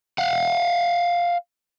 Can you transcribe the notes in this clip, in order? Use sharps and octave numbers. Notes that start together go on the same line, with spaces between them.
F5 F#5